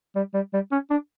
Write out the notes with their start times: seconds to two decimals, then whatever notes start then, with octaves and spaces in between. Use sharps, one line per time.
0.16 G3
0.34 G3
0.53 G3
0.71 C#4
0.90 D4